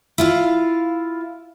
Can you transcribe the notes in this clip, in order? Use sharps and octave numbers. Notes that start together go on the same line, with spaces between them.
E4 F4 F5